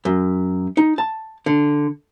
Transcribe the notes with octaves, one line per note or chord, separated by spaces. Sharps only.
F#2
D#4
A5
D3